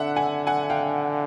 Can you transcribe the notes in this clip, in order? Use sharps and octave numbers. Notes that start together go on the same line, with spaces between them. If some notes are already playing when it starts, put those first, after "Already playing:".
Already playing: D3 E5 F#5
F#5 G#5
F#5 G#5
F5 G5